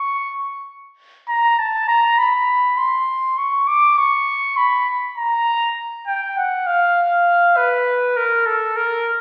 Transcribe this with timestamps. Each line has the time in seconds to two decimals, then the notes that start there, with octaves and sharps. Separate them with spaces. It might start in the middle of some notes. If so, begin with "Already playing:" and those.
Already playing: C#6
1.28 A#5
1.59 A5
1.88 A#5
2.18 B5
2.77 C6
3.38 C#6
3.68 D6
3.98 C#6
4.57 B5
5.17 A#5
6.07 G5
6.37 F#5
6.67 F5
7.57 B4
8.17 A#4
8.46 A4
8.76 A#4